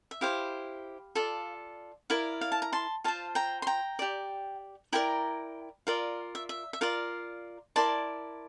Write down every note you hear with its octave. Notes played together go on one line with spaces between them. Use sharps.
E5
E4 G4 C5 F5
F4 A4 D5
E4 A#4 D5 F5
F5
A5
A#5
A5 C6
F4 C5 F5 A5
G5 A#5
C6
G5 A#5
G4 D5
E4 A#4 D5 G5 A#5
F4 A#4 D5 F5
E5
E5
E5
F4 A#4 D5 F5
E4 A#4 D5 A5 C6